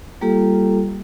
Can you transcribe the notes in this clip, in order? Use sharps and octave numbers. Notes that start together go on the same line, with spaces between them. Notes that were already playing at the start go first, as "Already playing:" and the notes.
G3 A#3 F4 G4 A4